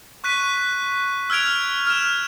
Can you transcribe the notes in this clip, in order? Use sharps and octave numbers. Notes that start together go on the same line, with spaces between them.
C#6 F#6 B6 D#7
E6 F6 G#6 D7 F7
F6 E7